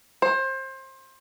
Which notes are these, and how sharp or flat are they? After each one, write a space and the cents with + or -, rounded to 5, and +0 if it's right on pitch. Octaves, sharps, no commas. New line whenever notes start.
C5 +25